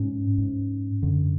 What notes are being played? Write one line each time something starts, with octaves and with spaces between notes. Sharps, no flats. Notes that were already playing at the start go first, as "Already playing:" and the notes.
Already playing: G#2 C#4
G#2
F#2 D3